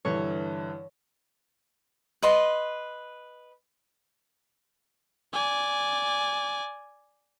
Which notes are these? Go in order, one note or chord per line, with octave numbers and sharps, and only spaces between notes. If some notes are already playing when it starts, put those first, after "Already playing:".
G2 D3 E3 C#5
B4 D#5 C6
D5 G#5